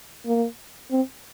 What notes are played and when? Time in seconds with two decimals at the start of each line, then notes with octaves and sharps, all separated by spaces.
0.26 A#3
0.91 C4